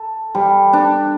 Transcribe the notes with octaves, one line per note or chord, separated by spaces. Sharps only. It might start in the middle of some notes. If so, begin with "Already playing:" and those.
Already playing: A4
G3
D4